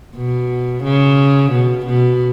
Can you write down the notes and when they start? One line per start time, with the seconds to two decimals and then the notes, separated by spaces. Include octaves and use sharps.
0.16 B2
0.84 C#3
1.52 B2
1.86 B2